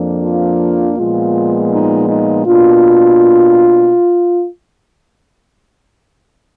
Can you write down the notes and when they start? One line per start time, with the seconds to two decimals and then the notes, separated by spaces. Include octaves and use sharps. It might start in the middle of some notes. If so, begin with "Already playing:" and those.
Already playing: F2 F3 A#3 D4
0.25 F4
0.98 A#2 F3 G#3 B3 F4
1.72 D#4
2.09 D#4
2.47 B2 A#3 D4 F4